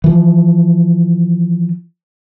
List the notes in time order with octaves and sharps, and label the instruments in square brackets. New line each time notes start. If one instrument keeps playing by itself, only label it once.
[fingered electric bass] E3 F3